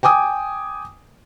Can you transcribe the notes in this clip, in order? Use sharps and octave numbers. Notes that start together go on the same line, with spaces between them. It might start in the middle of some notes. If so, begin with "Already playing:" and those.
G5 G#5 D6 D#6